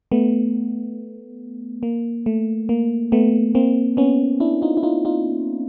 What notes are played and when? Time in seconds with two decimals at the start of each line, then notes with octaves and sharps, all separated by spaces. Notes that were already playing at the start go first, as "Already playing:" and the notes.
0.12 A3 B3
1.83 A#3
2.26 A3
2.69 A#3
3.12 A3 B3
3.55 A#3 C4
3.97 B3 C#4
4.40 D4 E4
4.62 D#4 F4
4.77 E4
4.83 D#4 F4
5.05 D#4 F4